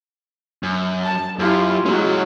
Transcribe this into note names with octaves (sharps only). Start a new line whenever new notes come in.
F#2
A5
F#2 E4 F4 G4
F#3 G#3 C#4 E4